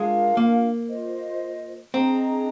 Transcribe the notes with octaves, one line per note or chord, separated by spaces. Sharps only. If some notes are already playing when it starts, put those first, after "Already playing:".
Already playing: G#3 D4 F4 A#4 F5
A#3
F4 C5 D#5
C4 D4 G#4 D#5 A#5